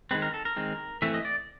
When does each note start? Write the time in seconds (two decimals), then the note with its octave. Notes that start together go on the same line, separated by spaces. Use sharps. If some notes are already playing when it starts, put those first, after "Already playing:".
0.11 D#3 G#3 C4 B4
0.22 A#4
0.34 A4
0.45 A#4
0.56 D#3 G#3 C4
1.02 E3 A3 C4 E5
1.14 D#5
1.25 D5